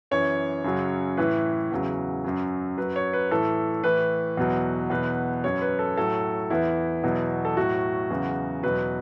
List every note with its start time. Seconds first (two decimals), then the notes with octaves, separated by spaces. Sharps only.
0.11 F#2 E3 C#5
0.64 F#2 C#3 F#3
1.17 A2 E3 B4
1.72 E2 C#3 F#3
2.24 F#2 F#3
2.78 F#2 F#3 B4
2.96 C#5
3.13 B4
3.31 A2 E3 A4
3.84 A2 E3 B4
4.37 E2 B2 F#3
4.90 E2 B2 F#3 B4
5.44 F#2 F#3 C#5
5.62 B4
5.79 A4
5.97 A2 F#3 A4
6.50 E2 E3 E4
7.03 E2 B2 F#3
7.45 A4
7.57 A2 F#3 F#4
8.10 E2 C#3 F#3
8.63 E2 B2 F#3 B4